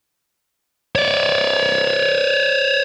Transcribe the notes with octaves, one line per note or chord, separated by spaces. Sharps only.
C#5 D5